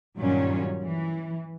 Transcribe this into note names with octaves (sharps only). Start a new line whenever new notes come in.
G2 A#2 D#3 F#3 G3 C#4
E3